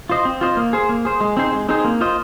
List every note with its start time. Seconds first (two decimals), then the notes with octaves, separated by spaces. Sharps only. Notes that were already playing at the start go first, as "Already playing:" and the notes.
0.09 F4 C5 D#5
0.25 C4
0.41 F4 C5 D#5
0.57 A#3
0.73 G#4 C5
0.89 A#3
1.05 G#4 C5
1.21 G#3
1.37 C4 D#4 G#4 C5
1.53 G#3
1.69 C4 D#4 G#4 C5
1.84 A#3
2.01 F4 C5 D#5